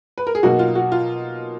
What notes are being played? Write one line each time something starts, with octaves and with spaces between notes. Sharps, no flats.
B4
A#4
G#4
B2 F#3 A#3 D#4 F#4
F4
F#4
F4